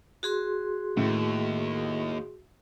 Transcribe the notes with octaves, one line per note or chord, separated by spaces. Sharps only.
F#4 G#4 C6
D#2 A2